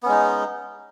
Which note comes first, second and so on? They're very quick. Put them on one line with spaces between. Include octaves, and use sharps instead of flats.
B3 C#4 G#3 D#4